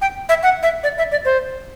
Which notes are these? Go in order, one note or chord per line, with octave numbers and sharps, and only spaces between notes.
G5
E5
F#5
E5
D5
E5
D5
C5